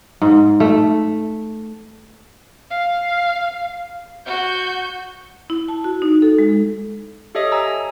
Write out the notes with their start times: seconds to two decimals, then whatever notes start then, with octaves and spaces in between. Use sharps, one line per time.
0.22 G#2
0.60 A3
2.71 F5
4.26 F#4 G6
5.50 E4
5.68 A5
5.84 F#4
6.02 D#4
6.22 A4
6.39 G#3
7.35 G4 A4 C#5 D#5 E5 D#6
7.52 G#5 A#5 E6